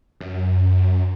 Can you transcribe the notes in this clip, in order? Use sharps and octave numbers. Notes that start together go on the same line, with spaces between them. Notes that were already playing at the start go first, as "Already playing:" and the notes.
F#2